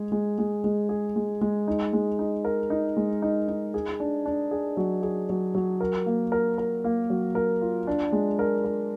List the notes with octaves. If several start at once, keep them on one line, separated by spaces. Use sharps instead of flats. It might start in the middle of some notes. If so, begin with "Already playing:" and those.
Already playing: G#3 G#4
G#3
G#3
G#3
G#4
G#3
G#3
D#4
G#3
D#4
A#4
D#4
G#3
D#4
D#4
G#4
D4
D4
G#4
F#3
G#4
F#3
F#3
A#4
A#3
A#4
A#4
A#3
F#3
A#4
F4
D4
G#3
A#4
A#4